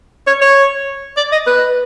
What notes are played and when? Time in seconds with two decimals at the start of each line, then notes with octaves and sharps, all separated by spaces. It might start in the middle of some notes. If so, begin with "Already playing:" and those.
0.27 C#5
0.42 C#5
1.17 D5
1.32 D#5
1.47 B4